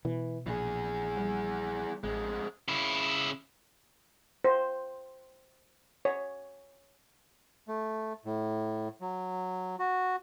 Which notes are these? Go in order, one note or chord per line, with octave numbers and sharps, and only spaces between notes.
B2 E3
A#1 E3 G#4
G3
A1 F2 G#3
C#3 E4
C5
C#5
A3
A2
F#3
F#4